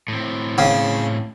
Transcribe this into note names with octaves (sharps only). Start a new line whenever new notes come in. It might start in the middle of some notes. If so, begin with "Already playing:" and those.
A2 C4
C#3